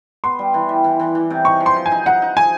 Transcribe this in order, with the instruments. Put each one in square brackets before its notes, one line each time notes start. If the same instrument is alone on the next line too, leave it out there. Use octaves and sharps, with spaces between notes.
[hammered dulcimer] B3 [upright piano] C6
[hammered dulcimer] G3
E3
G3
E3
E3
E3
C3
[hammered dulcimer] D#4 [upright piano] C#6
[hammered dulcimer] F3
[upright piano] C6
[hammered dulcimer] F3
[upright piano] G#5
[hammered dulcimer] D#4
[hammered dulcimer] D#4 [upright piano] F#5
[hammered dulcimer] D#4
[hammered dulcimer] F3 [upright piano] G#5